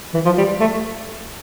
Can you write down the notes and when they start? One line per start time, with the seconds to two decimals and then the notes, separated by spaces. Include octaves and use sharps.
0.14 E3
0.25 F3
0.38 G3
0.60 A3